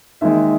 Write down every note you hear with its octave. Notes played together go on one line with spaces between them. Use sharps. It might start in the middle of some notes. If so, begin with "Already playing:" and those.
D#2 D#3 G#3 E5